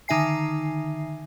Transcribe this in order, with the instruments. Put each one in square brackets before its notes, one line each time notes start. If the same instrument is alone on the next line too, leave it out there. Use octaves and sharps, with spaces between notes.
[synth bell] D3 D#3 D#4 E5 G#5 C7